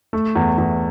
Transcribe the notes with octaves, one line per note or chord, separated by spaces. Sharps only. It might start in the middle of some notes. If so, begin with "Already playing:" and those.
A3
E2
E2